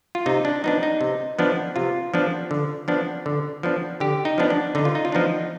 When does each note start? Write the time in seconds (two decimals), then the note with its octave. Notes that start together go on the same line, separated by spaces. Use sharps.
0.15 F4
0.26 C3 D#4
0.45 D4
0.64 F3 B3 D4 D#4
0.83 D#4
1.01 C3
1.39 F3 B3 D4
1.76 C3 F4
2.14 F3 B3 D4
2.51 D3
2.88 F3 B3 D4
3.26 D3
3.63 F3 B3 D4
4.00 D3 G4
4.25 D#4
4.38 F3 B3 D4
4.50 D4
4.75 D3 D#4
4.85 F4
4.95 D#4
5.05 F4
5.12 F3 B3 D4 D#4